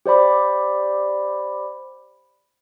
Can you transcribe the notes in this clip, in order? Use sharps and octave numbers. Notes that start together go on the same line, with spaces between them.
G4 C5 D5 B5 D6